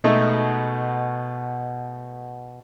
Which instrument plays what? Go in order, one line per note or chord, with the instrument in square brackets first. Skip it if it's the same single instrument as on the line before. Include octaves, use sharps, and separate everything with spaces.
[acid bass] B2 [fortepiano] G#3 A3 D#4